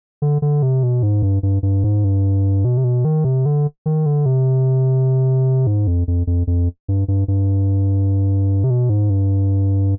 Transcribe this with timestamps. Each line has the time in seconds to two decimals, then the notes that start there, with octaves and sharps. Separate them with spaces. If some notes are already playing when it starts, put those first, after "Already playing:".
0.22 D3
0.42 D3
0.63 C3
0.83 B2
1.03 G#2
1.22 G2
1.43 G2
1.63 G2
1.84 G#2
2.04 G2
2.65 B2
2.77 C3
2.84 B2
3.05 D#3
3.24 C3
3.46 D3
3.86 D#3
4.06 D3
4.26 C3
5.67 G#2
5.87 F2
6.08 F2
6.27 F2
6.47 F2
6.88 G2
7.08 G2
7.28 G2
8.64 C3
8.70 B2
8.90 G#2
9.10 G2